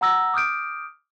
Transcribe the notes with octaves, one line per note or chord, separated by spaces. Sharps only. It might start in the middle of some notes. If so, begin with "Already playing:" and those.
F#5 A#5 E6 A#6
D6 D#6 F6 G6 D7